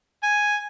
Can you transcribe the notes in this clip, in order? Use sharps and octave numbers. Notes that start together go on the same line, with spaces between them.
G#5